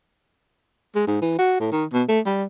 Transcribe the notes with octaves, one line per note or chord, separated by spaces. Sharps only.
G#3
G#2
E3
F#4
A2
D#3
B2
A3
G3